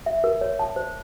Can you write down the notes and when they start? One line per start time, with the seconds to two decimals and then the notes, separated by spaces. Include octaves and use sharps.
0.06 E5
0.24 A#4
0.41 C#5
0.59 A5
0.76 C5